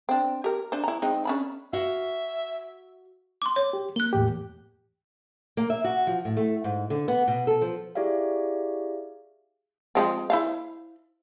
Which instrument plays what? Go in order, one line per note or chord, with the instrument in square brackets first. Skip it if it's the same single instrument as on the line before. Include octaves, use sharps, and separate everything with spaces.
[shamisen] C4 D4
G4 A#4
D4 C5
E4 A#5
G#3 C4 D#4
C#4 D4 B5
[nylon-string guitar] F#4 F5 [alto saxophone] E5
[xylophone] C6 D6
C#5
[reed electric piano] G4
[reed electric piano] A#3 [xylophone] F#6 G7
[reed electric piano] E2 A2 G4
[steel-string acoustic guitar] A#3
E5
F#4
F3
A2
A3
G#2
D3
B3
B2
A4
F3
[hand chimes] E4 G4 G#4 D5 E5 F5
[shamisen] F3 G#3 C4
E4 C5 F5